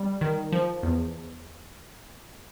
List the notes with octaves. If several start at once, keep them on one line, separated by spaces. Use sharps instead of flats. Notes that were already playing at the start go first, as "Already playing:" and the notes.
Already playing: G3
D#3
F3
E2